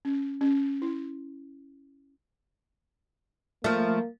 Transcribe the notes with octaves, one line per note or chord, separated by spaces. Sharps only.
C#4
C#4
E4
F3 A3 A#3